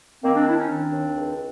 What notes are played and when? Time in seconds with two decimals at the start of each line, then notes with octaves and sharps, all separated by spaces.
0.23 D#3 A#3 C4
0.35 C4 D4
0.46 D#2 D4 E4
0.58 C#4 D#4
0.69 D#3 C4 D4
0.92 D#2
1.15 C#2